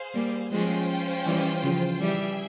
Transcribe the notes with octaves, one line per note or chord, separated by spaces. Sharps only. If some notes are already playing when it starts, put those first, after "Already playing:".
Already playing: G#4 C5 F5
G3 A#3
F3 G#3 C#4 F4 C5 G5
E3 G3
C#3 F3
E3 G3 G#4 E5 G5